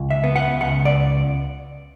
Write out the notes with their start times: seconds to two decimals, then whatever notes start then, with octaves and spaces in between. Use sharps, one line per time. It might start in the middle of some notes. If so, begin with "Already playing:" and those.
Already playing: C#2
0.10 E5
0.24 B3
0.36 F#5
0.61 C#2 F#5
0.85 D5